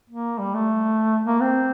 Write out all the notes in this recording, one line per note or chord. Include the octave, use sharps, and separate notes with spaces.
A#3
G3
A3
A#3
C4